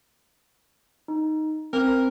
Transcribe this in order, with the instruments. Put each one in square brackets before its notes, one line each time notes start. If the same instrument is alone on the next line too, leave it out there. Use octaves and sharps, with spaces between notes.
[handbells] D#4
[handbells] C4 [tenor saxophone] A#4